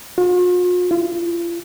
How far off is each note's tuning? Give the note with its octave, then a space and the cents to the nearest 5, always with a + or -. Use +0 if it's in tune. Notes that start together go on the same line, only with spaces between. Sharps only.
F4 +45
F4 -40